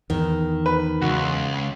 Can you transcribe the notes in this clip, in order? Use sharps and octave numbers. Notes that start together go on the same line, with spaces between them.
E2 D#3
B4
C#2 F#4